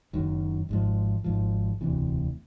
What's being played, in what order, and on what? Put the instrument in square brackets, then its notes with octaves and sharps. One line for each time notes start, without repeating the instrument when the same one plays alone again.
[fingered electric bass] F#1 F#2 D#3
G#1 G#2 F3
G#1 G#2 F3
E1 D2 C3 E3